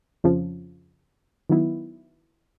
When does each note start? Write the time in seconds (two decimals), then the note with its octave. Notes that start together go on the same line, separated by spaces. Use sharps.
0.24 F2 C#3 F3
1.50 D#3 F#3 B3 E4